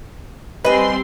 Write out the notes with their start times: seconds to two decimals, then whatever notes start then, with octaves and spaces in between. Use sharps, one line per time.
0.64 G3 C4 B4 D#5 G#5 C6